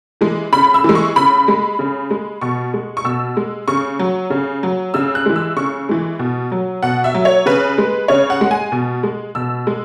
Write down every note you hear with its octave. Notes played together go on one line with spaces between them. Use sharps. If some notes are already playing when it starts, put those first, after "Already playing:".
E3 G#3
C#3 B5
E6
E3 G#3
C#6
C#3 B5
G#3
C#3
G#3
B2 C#6
G#3
C#6
B2 E6
G#3
C#3 C#6
F#3
C#3
F#3
C#3 E6
F#6
E3 G#3
E6
C#3 C#6
E3 G#3
B2
F#3
B2 F#5
E5
F#3
C#5
C#3 B4
G#3
C#3 C#5
F#5
G#3
G#5
B2
G#3
B2 E6
G#3